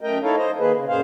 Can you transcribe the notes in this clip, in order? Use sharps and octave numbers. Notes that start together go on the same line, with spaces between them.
F#2 A3 A#4 D#5 G5
D#4 E4 A4 A#4 C#5 F5
C5 D#5
D#3 A#3 G#4 B4
C#3
F#2 A#2 G#4 C5 F5